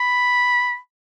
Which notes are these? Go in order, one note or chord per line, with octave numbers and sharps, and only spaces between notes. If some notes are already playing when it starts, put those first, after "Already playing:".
Already playing: B5